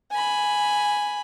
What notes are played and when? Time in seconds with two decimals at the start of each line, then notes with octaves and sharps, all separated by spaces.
0.11 G#5 B5